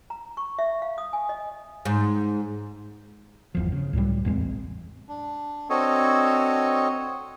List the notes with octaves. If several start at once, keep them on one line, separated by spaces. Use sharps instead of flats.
A#5
C#6
E5
F5
D#6
G#5
D#5
G#2
G1 E2 F3
C#3
C#2 A2 F#3 G3
A1 E2 G#3 C4
D4
C4 D4 F#4 A4 C#5 D#5